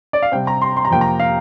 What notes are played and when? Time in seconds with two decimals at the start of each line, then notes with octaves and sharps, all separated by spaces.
0.13 D5
0.22 F5
0.32 C3 G3 C4 G5
0.47 A#5
0.62 C6
0.77 C6
0.85 A#5
0.90 F2 C3 A#3 G5
1.01 A#5
1.20 F5